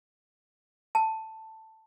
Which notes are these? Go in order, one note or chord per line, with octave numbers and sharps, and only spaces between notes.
A5